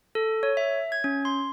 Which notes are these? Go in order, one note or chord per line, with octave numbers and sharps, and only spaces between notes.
A4
C#5
E5
G#6
C#4
C6